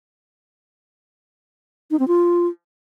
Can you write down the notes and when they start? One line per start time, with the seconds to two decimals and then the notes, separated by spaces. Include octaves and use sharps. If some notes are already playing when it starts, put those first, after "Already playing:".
1.91 D#4
1.99 C4
2.08 F4